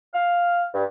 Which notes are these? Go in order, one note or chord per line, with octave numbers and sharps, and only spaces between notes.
F5
G2